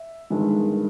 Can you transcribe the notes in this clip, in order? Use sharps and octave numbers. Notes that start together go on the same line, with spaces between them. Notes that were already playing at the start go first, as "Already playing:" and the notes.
Already playing: E5
G1 G2 D#3 G#3